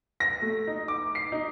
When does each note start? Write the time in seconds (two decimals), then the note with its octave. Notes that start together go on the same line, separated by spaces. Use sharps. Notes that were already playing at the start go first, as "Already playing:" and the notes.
0.20 A#6
0.42 A3
0.67 D#4
0.88 D6
1.15 C7
1.32 D#4